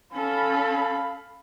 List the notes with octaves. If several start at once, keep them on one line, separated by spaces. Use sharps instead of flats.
C#4 A4 F5 B5